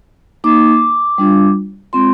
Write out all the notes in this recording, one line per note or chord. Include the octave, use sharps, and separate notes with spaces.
A#3 D#4 D6
G3 D4 F4
G#3 C4 F4 C6